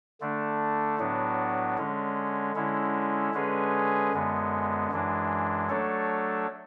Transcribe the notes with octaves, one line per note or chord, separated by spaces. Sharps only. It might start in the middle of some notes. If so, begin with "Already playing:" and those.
D3 A3 D4
A2 F#3 B3 D4
D3 G#3 C#4
D3 G#3 C#4 E4
D3 G#3 C#4 G#4 B4
F#2 D3 G#3 B3
F#2 E3 G#3 D4
F#3 A3 D4 A4 C#5